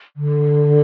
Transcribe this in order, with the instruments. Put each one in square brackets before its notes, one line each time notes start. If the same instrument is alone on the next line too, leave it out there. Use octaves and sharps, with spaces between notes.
[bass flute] D3